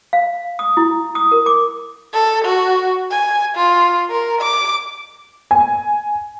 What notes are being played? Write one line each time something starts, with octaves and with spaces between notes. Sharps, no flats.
F5
D#6
E4
D#6
A#4
D6
A4
F#4
G#5
F4
A#4
D6
G#5